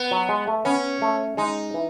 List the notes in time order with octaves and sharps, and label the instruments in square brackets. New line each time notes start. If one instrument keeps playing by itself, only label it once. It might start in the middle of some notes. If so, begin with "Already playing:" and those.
Already playing: [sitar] B3
[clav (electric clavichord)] F#3
G#3
A3
[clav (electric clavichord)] B3 [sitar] C#4
[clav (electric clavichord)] A3
[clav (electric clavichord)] G#3 [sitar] D#4
[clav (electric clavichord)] E3